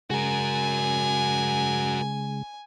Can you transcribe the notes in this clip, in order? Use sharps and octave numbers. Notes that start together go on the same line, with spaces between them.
C#3 G#3 F#4 A#4 G#5